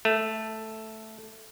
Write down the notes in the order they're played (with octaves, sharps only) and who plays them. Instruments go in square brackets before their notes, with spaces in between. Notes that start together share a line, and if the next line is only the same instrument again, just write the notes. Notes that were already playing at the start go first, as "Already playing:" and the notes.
[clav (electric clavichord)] A3